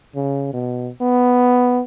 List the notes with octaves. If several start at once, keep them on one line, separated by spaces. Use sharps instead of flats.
C#3
B2
B3